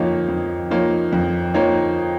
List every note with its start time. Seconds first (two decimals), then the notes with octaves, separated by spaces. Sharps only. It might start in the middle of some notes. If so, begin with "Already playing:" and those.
Already playing: F2 F3 A#3 D#4 C#5
0.29 F2
0.71 F3 A#3 D#4 C#5
1.13 F2
1.54 F3 A#3 D#4 C#5